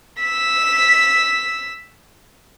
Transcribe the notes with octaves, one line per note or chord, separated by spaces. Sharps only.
E6 B6